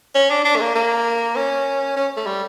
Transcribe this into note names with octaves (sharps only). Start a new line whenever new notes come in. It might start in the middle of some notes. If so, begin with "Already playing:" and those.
C#4
D4
D4
A3
A#3
A#3
C#4
C#4
A3
G3